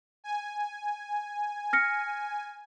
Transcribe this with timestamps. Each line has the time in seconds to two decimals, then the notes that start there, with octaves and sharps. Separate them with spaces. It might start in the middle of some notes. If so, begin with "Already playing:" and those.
0.24 G#5
1.73 F6 A#6 C#7